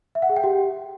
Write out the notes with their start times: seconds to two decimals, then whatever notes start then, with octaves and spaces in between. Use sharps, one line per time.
0.15 E5
0.22 F#5
0.29 G#4
0.36 G5
0.44 G4